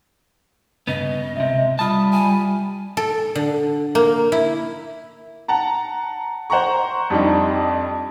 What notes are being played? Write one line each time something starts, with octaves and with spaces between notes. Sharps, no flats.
G2 C#3 B3 D#5
C#2 C3 E5
G3 F4 A5 B5 D#6
G#5
A4
D3
A#3
E4
F#5 A5 A#5
C5 F#5 A#5 C#6
F2 G3 D4 D#4